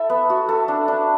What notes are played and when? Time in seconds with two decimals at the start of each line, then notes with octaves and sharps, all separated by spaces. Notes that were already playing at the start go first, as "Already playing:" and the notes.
Already playing: E4 A4 E5
0.10 B3
0.30 F#4
0.49 A4
0.68 D4
0.88 D4